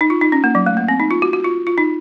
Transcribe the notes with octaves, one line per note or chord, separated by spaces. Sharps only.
D#4
F4
D#4
C#4
A#3
F#3
A3
A#3
C4
D#4
F4
F#4
F#4
F4
F4
D#4